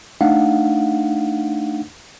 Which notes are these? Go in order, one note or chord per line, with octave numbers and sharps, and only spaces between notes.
A3 D4 D#4 F5 F#5